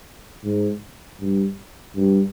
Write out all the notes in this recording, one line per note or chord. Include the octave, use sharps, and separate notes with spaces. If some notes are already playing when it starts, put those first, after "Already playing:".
G#2
G2
G2